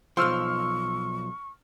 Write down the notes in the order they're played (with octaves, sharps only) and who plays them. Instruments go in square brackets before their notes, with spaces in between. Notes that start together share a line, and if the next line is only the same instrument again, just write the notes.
[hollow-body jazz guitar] B1 F3 [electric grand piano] C6 E6 F6 [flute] C#6